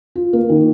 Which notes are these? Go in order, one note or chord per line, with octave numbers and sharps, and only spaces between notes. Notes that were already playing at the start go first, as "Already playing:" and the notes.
F4
A#3
D#3